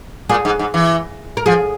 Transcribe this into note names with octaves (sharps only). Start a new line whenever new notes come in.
A#2 G#4
G#2
G#2
E3
A#4
F3 G#4